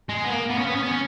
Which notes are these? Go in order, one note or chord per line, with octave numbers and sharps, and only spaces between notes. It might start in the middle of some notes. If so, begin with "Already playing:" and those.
G#3
B3
A#3
B3
C#4
B3
C#4
B3
C#4